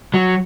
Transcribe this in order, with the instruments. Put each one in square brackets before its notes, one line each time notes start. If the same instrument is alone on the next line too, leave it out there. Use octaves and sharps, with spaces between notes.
[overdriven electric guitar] F#3